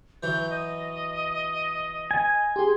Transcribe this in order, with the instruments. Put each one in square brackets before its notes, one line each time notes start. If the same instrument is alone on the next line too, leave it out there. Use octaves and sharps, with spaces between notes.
[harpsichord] E3 F#3 [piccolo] G6
[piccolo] D#5
[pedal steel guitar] G#5
[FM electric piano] G4 G#4 [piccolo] C6